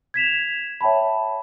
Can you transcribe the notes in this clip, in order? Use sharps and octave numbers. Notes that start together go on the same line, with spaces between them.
G#6 B6 E7 F7
C#5 E5 G5 A5 B5